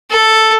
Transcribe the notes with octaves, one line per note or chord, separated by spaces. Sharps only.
A4